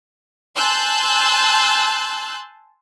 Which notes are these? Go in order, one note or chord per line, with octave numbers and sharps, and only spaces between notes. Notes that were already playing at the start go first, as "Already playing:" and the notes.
G#5 A5 C6 E6 F#6 G6